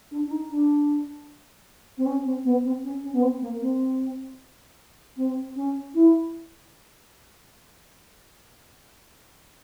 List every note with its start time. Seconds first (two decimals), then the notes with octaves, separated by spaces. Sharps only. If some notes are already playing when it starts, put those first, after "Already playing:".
0.11 D4
0.27 D4
0.31 D#4
0.50 D4
1.97 C4
2.06 C#4
2.25 C4
2.44 B3
2.64 C4
2.84 C#4
3.03 C#4
3.13 B3
3.22 C4
3.41 A#3
3.61 C4
5.17 C4
5.55 C#4
5.94 E4